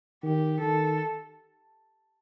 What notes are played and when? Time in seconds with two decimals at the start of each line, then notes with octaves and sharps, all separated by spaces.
0.23 D#3 G4
0.61 D#3 A4